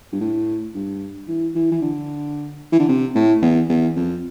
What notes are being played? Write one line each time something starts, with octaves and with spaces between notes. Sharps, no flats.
G2
A2
G2
E3
E3
E3
D3
E3
D3
C3
A2
E2
E2
F2